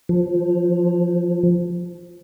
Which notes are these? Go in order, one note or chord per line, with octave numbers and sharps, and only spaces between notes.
F3